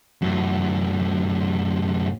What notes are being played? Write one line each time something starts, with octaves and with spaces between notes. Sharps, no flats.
F#2 A2